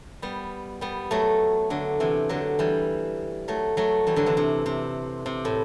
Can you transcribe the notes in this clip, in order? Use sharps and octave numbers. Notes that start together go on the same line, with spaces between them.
G3 B3
G3 B3
F#3 A3
D3 F#3
C3 E3
D3 F#3
E3 G3
F#3 A3
F#3 A3
E3 G3
D3 F#3
C3 E3
C3
C3
C3
A2